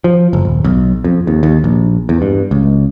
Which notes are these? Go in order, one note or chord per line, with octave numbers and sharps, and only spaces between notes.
F3
F#1
D#1
B1
F2
D#2
D#2
A#1
E2
G2
C#2